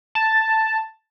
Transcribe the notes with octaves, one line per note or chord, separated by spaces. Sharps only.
A5